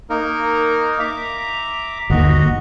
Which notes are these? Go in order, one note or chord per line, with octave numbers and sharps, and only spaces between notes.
A#3 D#4 A#4
E5 A#5 D6
G1 D#2 F#4 D#5